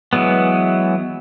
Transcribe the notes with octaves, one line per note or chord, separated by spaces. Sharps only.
E3 F#3 G#3 B3